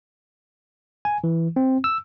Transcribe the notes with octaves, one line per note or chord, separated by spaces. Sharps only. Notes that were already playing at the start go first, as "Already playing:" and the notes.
G#5
E3
C4
E6